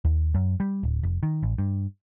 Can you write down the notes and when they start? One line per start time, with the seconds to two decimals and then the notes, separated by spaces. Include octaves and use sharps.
0.05 D#2
0.34 F#2
0.60 G3
0.83 D1
1.03 F1
1.23 D#3
1.43 A1
1.58 G2